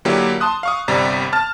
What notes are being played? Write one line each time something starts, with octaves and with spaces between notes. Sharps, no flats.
D3 F#3 A#3 E4 G4
A5 C6 D#6 F#6
F5 C#6 D#6
G1 C3 G3 A#5 A6
A5 F6 A6